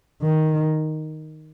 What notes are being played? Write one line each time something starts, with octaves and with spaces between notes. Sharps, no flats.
D#3